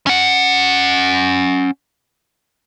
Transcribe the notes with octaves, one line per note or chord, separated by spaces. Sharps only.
C#4 F#5